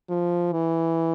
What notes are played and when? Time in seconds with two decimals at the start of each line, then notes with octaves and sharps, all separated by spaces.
0.09 F3
0.52 E3